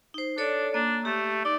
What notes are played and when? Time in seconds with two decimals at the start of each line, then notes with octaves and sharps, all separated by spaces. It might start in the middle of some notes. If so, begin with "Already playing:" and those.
0.14 D#4 C5
0.38 D4 A4 C#5 D5
0.74 A#3 D4
1.05 A3 G4
1.45 D#4 D5